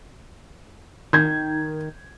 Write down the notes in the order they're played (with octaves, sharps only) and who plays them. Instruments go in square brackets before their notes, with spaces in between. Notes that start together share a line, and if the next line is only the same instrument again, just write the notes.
[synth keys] D#3 [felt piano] G6 G#6